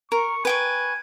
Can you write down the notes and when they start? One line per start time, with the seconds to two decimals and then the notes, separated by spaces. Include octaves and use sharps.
0.12 A#4 C#6
0.45 B4 G5 G#5 C#6